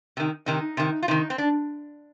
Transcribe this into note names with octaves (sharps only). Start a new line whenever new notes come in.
C3 D#3
C3 D#3 D#4
C3 D#3
F4
C3 D#3 D#4
C4
D4